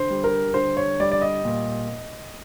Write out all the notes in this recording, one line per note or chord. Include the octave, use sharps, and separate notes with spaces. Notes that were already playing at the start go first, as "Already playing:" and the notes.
Already playing: D3 C5
G3
A#4
D3 C5
C#5
G3 D5
D5
D#5
A#2